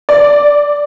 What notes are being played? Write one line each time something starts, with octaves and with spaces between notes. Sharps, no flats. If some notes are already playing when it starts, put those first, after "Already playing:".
D5